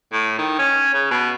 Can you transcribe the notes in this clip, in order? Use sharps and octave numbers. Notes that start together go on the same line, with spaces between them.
A2
D#3
C#4
C#3
B2